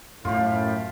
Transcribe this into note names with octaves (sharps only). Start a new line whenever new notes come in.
F#2 A2 F4 G4